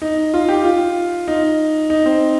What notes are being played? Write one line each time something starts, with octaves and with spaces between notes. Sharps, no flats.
D#4
F4
G4
F4
D#4
D#4
C4